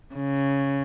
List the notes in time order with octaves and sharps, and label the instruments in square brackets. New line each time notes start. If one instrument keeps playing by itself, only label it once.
[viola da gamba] C#3